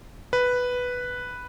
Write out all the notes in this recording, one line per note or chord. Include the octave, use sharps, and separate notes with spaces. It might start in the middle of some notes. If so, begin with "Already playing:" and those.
B4